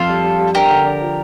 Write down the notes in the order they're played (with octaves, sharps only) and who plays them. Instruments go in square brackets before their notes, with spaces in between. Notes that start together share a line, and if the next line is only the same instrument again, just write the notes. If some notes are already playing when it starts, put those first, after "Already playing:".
Already playing: [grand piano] F2 [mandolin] F4 A4
[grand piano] G3
G3
G3
[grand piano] D4 [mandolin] G4 A#4
[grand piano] D3
D4
F3